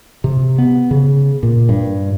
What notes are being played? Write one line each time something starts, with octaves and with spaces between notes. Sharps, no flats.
C3
B3
C#3
A#2
G2